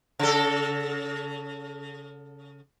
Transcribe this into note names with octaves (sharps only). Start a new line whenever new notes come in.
C#3 A4